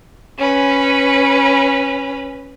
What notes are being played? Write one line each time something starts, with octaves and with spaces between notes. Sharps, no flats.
C#4 B4